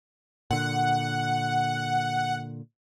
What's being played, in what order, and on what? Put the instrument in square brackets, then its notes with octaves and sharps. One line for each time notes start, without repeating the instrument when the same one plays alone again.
[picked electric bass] A#2 D3 [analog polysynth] F#5